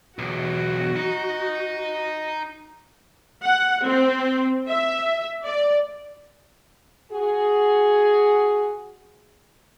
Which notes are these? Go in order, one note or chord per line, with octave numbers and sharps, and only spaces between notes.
B1 E2 F#4
D#4
F#5
C4
E5
D5
F#4 G#4